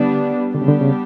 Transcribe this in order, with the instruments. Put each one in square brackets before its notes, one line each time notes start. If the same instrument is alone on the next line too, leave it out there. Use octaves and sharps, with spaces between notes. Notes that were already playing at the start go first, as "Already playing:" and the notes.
Already playing: [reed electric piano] D3 [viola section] G3 B3 D4
[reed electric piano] D3 [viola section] G3 B3 D4 G4
[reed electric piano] C#3
D3
C#3